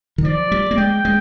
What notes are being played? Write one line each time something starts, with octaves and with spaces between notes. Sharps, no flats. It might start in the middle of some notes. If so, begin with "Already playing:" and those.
D#3
F3 D5
G3
A#3
G#3 G5
G#3